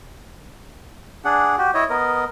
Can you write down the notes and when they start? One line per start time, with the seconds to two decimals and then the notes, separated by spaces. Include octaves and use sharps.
1.25 D4 G#4 F#5
1.58 F#4 G4
1.74 E4 C#5 D#5
1.90 B3 A#4 D#5